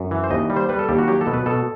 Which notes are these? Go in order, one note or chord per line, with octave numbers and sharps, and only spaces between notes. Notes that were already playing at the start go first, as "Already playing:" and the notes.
Already playing: F#2
E3
C5
D#2 D#5
G3
C5
G3 B4
A4
D#2 G4
F#4
F#3 G4
A4
B2
B4
B2 A4